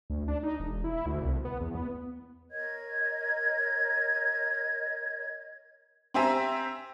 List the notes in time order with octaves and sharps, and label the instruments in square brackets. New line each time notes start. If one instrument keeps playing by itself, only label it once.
[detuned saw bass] D2
D4
D#4
E1
E4
D2
C2
B3
E2
B3
[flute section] A#4 C#5 D#5 G#6
[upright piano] C4 G4 C5 E5 G#5 A#5